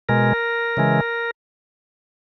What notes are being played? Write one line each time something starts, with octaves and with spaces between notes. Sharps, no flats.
B2 G#3 A#4
C#3 E3 G#3